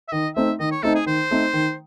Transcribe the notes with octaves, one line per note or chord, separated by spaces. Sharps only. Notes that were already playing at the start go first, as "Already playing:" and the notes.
E5
D#3 D#5
A3 C4 D#4 E5
D#3 D#5
C#5
A3 C4 D#4 A4
G#4
D#3 C5
A3 C4 D#4
D#3